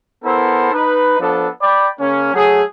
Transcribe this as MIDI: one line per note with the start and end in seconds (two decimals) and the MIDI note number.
0.24 0.72 59
0.24 0.72 64
0.24 0.72 69
0.24 0.72 70
0.24 0.72 72
0.72 1.19 63
0.72 1.19 71
1.20 1.48 53
1.20 1.48 59
1.20 1.48 62
1.20 1.48 69
1.62 1.89 74
1.62 1.89 79
1.62 1.89 83
1.99 2.32 49
1.99 2.32 58
1.99 2.32 61
2.34 2.62 54
2.34 2.62 57
2.34 2.62 68